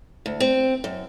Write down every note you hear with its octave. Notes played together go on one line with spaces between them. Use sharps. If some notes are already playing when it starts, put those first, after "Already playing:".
D2
C4
F#2